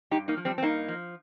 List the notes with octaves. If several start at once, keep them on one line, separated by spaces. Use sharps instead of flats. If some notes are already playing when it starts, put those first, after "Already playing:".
G2 D#4 G4
A#3 D#4
F3
G3 C4
C4
G2 A#3 D#4
F3